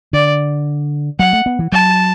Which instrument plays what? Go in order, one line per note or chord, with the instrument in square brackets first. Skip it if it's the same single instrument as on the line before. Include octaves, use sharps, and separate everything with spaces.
[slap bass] D3 [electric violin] D5
[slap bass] F#3 [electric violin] F#5
[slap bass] A3
B3
E3
[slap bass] F#3 [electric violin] A5